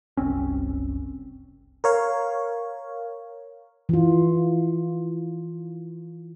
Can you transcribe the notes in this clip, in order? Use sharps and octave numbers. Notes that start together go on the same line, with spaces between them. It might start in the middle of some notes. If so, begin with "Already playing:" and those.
F#1 C2 C4 C#4
A#4 C#5 F5
E3 F4